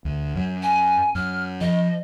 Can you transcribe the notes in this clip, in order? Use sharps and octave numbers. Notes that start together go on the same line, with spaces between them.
D2
F#2 F#3
G#5
F#2 F6
F3 D#5